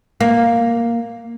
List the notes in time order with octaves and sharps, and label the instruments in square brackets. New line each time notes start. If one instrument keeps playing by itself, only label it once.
[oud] A#3